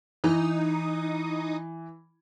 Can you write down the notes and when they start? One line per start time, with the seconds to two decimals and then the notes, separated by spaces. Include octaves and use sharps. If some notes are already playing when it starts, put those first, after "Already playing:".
0.24 E3 D#4